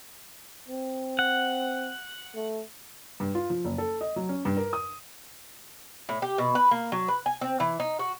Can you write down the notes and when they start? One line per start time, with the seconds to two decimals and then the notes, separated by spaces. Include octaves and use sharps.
0.68 C4
1.19 F#5
2.35 A3
3.20 G2
3.35 F4
3.50 F3
3.65 F#1
3.78 A4
4.01 D#5
4.16 F#3
4.29 C#4
4.45 G2
4.57 A#4
4.73 D#6
6.09 A2
6.22 G4
6.38 B2
6.55 B4
6.71 A#3
6.92 F#3
7.08 B4
7.26 G#5
7.41 C4
7.60 E3
7.80 D#4
7.99 F#4